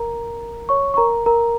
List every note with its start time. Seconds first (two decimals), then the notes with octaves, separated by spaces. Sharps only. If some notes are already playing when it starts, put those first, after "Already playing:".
Already playing: A#4 A#5
0.69 C#5 C#6
0.94 C#6
0.97 A#4 A#5
1.26 A#4 A#5